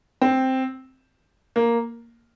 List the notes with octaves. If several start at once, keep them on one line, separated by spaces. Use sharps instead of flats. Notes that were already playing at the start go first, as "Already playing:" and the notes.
C4
A#3